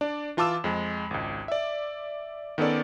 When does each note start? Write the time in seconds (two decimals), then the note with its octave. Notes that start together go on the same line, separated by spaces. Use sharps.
0.01 D4 D5
0.37 E3 F4 A5 D6 E6 E7
0.64 F2 G#3
1.11 G#1 C#2
1.48 D5 E5
2.58 D#3 B3 C#4 A4 D5